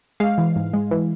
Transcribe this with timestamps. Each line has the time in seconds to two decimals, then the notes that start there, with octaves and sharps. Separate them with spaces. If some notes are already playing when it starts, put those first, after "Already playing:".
0.20 G#3 F5
0.38 E3
0.56 G#2
0.73 G#3
0.91 E3